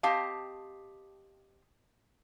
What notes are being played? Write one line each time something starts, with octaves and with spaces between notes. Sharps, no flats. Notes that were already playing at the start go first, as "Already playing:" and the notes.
C4 G4 D#5 F5 A5